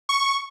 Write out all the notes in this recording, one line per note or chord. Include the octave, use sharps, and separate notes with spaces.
C#6